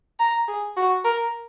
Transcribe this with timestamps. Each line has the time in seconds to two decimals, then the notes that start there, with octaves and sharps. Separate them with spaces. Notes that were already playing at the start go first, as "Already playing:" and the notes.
0.19 A#5
0.48 G#4
0.76 F#4
1.04 A#4